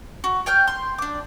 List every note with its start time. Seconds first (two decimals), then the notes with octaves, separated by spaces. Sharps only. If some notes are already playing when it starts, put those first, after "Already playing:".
0.24 F#4
0.46 C#5 G5 F6 G6
0.67 C6
0.98 D4 D6